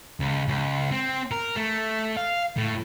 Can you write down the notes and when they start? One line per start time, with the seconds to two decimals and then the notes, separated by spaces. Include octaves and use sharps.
0.20 C#2
0.49 C#2
0.92 C4
1.31 A#4
1.56 A3
2.17 F5
2.57 A2